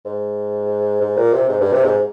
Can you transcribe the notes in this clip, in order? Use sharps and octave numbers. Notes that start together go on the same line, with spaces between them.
G#2
G#2
A#2
C3
G#2
G2
C3
G#2